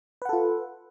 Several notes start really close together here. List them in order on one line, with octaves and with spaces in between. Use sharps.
B4 F#5 A4 F4